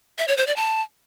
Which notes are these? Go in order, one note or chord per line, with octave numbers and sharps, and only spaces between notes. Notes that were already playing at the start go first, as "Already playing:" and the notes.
E5
C#5
C5
D5
A5